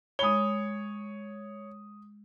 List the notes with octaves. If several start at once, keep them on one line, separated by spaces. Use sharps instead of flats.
G#3 C#5 B5 D#6 G7